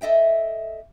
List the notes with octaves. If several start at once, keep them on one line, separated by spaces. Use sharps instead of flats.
A4 D#5 E5 G5